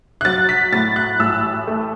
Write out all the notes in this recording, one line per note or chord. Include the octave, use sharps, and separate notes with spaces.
F#6
F#3 A6
B6
A2 A6
F#6
A1 E6
A3